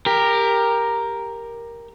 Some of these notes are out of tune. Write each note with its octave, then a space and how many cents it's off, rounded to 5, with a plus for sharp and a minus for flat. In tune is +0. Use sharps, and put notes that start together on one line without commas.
G4 +15 A#4 +0